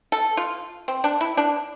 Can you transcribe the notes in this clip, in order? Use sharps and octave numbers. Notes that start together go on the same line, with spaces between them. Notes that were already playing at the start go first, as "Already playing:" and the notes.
A4
F4
C4
D4
E4
D4